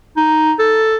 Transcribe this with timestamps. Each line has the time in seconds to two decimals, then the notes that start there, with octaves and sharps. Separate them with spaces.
0.17 D#4
0.59 A4